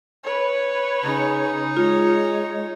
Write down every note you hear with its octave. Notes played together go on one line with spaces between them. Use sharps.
B4 C#5
C#3 D#4
G#3 F4 C#5